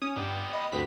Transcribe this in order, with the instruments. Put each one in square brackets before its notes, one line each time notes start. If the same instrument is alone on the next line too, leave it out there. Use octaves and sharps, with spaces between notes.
[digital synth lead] C#4 [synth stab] D#6
[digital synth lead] G2 [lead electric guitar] B3 G4 [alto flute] D5
[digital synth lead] D#5 [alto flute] B5
[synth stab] D2 B6 [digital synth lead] G2 [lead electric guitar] B3 C4 [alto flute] B4